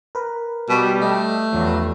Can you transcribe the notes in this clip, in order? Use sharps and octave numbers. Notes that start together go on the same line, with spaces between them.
A#4 B4
B2 G3
A3 D#5
E2 G2 F3 F#3